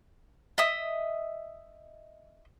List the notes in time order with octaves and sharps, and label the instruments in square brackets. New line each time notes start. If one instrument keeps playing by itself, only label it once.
[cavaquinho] D#5 E5 D#6